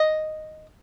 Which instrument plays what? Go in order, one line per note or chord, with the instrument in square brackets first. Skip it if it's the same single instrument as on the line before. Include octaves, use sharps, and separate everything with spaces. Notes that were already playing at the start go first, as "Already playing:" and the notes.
Already playing: [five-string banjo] D#5